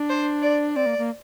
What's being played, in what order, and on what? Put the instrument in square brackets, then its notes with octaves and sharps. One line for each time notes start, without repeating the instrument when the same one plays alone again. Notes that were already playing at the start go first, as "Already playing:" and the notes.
Already playing: [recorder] D4
[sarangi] C5
D5
[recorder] C4 [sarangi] D5
[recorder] A#3
A#3